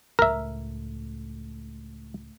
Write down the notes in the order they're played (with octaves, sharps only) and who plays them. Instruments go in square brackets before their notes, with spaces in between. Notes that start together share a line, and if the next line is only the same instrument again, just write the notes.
[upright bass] C#2 A2 [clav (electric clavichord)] A#4 E5